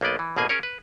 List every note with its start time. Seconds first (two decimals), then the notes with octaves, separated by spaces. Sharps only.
0.01 B1 A#3 B3 D5 D#5
0.19 E3
0.36 A1 B2 A#3 G#4 G#5
0.49 C#4 G#4 A#4 C#5
0.63 B4